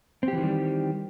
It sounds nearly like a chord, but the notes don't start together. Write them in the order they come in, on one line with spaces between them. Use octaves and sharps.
C4 G4 E3 D#3 G3